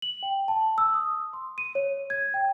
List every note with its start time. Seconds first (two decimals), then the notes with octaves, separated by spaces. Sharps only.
0.02 F#7
0.23 G5
0.48 A5
0.78 E6
0.94 D#6
1.33 C6
1.58 D#7
1.75 C#5
2.10 G#6
2.34 G5